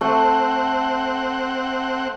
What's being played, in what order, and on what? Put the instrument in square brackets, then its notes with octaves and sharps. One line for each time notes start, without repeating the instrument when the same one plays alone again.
[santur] A3 [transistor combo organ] C4 F#5